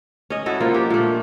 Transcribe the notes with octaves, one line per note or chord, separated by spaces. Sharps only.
C#4 D#5
E4 F#4 A4 D#5
F3 A#3 F4
D4 G4
A#2 A3